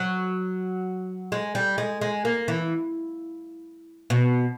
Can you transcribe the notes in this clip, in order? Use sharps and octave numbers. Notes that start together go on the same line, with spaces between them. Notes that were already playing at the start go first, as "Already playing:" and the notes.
Already playing: F#3
G#3
G3
G#3
G#3
A#3
E3
B2